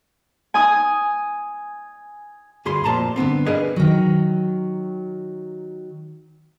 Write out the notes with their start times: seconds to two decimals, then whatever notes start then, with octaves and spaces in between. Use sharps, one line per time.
0.54 G#5 D#6
2.65 D2 G2 G#4 B5 C6
2.84 F2 A#2 A5 A#5 C6
3.16 G2 D3 B3 C4
3.46 D4 G#4 A#4 B4 C#5 D#5
3.76 D#3 F#3